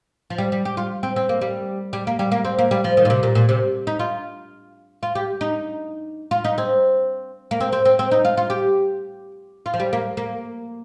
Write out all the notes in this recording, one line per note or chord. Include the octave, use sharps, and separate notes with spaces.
F3
G3
G3
G4
F4
C4
C4
A#3
G3
G3
A#3
G3
A#3
C4
A#3
G3
F3
D#3
A#2
C3
A#2
A#2
C3
D#4
F4
F4
G4
D#4
F4
D#4
C4
A#3
C4
C4
C4
C4
D#4
F4
F4
G4
F4
F3
G3
A#3
A#3